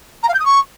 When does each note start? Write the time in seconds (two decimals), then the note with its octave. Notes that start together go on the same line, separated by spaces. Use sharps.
0.23 A#5
0.28 F5
0.34 G6
0.39 D#6
0.45 C#6